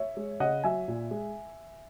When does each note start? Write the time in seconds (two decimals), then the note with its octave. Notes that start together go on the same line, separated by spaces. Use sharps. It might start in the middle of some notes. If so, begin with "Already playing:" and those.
Already playing: C#5 E5
0.17 G#3
0.40 C#3 D#5 F#5
0.64 F#3 E5 G#5
0.88 A#2
1.11 G#3